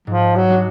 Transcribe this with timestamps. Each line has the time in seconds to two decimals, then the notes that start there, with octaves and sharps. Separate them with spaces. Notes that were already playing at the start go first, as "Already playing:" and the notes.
0.07 G#2 F3
0.36 F#3
0.49 G#3 D4 F#4